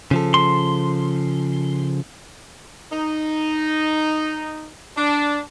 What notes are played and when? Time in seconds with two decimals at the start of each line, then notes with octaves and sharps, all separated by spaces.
0.11 C#3 F3 A4
0.34 C6
2.91 D#4
4.97 D4